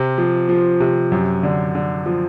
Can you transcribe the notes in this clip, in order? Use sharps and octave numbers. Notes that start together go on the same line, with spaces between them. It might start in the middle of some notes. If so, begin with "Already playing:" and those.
Already playing: C3
F3
F3
C3
F#2
D3
D3
F3